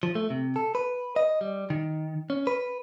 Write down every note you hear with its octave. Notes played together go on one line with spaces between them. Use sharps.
F3
A3
C3
A4
B4
D#5
G3
D#3
C#4
B4